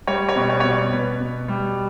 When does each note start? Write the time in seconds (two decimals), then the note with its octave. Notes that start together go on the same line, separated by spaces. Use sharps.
0.07 G3 C#5
0.29 C#5
0.36 B2
0.49 C#5
0.60 B2 C#5
0.71 D5
0.92 B2 B4
1.20 B2
1.48 G3